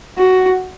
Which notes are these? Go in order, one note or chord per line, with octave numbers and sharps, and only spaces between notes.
F#4